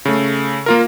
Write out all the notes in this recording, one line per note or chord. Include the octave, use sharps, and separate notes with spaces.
C#3 A3
A#3 F4 A#4